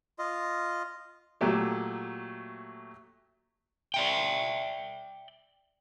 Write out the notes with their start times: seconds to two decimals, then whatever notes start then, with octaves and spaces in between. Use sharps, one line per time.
0.19 F4 D#5
1.41 A#2 F#3 A3 G4
3.94 D5 E5 G5